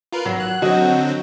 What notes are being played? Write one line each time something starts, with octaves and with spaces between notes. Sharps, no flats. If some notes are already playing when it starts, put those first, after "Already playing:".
F4 A#4 B4
G#1 F#3
F#6
D3 F#3 C4 F#4 D#5